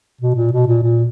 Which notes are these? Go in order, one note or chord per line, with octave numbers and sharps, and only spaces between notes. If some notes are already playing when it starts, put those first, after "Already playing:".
B2
A#2
B2
A#2
A#2